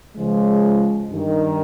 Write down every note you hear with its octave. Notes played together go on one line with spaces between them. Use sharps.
C#2 C#3 F3 G#3
G2 D#3